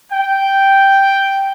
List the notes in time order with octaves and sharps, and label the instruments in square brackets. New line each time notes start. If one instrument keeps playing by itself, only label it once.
[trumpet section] G5